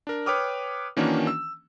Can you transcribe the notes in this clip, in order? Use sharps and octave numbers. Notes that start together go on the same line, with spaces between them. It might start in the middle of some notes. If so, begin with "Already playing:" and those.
D4 A#4
B4 C#5 G5 D6 D#6 F6
D#3 E3 A#3 C#4 D4 F#4
E6